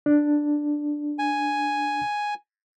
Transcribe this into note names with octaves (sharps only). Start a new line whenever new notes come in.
D4
G#5